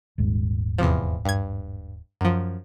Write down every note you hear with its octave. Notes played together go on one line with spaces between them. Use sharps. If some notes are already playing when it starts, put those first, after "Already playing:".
D#1 G#1 G#2
E2 C3 F3
G2 G#6
F#2 F3